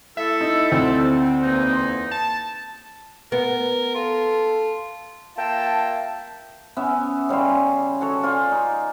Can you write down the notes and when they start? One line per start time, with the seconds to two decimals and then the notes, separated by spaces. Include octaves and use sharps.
0.17 A3 E4 A4 E5
0.41 D#4
0.72 D2 C4
1.43 E2 A#3 D#4
1.73 C6
2.11 A5
3.32 B3 A#4
3.95 F4 A4
5.37 A#3 F4 E5 G5 A5
6.77 B3 C#4 E5
7.29 C#3 G3 C#5 C6
8.01 F#4 A4 C#5
8.23 F4 D5 G#5
8.52 D#4